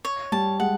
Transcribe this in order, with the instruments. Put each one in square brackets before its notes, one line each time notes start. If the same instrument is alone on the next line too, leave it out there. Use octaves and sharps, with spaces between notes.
[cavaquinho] C#5
[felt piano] G3 [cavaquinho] A5
[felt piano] G#3 [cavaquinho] F#5